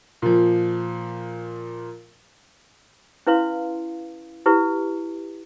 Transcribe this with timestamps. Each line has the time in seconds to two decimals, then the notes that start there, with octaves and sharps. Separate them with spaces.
0.22 A#2 F3
3.27 C#4 E4 B4 F5 C6
4.46 E4 G4 B4